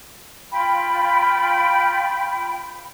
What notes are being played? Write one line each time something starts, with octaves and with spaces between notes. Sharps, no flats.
F4 G5 B5